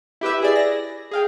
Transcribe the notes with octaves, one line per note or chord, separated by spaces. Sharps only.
E4 G4 B4 E5
E4 G#4 D5
A#6
G#4 F5 G5